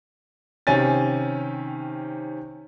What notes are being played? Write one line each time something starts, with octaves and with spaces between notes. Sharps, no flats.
C3 D#3 C#4 G#5 A6